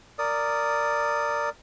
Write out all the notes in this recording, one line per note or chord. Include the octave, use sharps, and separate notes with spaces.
A#4 D5 D#6